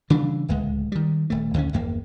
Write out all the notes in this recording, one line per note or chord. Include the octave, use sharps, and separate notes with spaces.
C#3 E3 G3 D4
D1 C#2 G#3
D#3 G3
D#1 A3
D2 D3 G#3 C#4
G1 E2 A#3